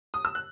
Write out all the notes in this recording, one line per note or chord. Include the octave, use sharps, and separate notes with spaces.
D#6
E6
F#6